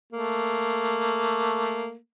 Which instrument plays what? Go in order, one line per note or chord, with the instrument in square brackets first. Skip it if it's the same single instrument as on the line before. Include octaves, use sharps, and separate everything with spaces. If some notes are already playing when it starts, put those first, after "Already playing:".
[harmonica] A3 A#3